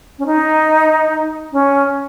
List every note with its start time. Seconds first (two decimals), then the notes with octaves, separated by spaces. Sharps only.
0.19 C#4
0.26 D#4
1.53 C#4